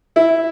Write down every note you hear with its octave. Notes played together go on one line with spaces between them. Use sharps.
E4